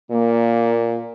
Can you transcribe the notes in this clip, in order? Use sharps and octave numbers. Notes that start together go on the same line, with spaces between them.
A#2 A#3